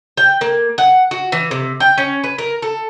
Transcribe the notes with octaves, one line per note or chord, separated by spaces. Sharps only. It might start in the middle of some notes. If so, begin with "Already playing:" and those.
G5
A#3
F#5
F#4
E3
C3
G5
C#4
B4
A#4
A4